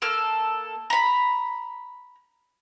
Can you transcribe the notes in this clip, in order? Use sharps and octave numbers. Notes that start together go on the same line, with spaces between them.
A#3 A4 F6
A#5 B5